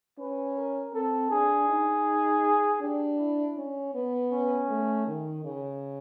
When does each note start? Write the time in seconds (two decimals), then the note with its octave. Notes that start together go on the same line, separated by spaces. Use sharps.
0.18 C#4 B4
0.57 A#4
0.93 C4 A4
1.30 D4 G#4
1.69 D#4
2.81 D4 G4
3.19 E4
3.57 C#4
3.94 B3
4.32 C#4
4.69 A3
5.07 D#3
5.44 C#3